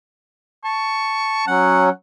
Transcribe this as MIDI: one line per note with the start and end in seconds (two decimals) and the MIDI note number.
0.64 1.46 81
0.64 1.47 85
1.47 1.89 54
1.47 1.89 61
1.47 1.90 78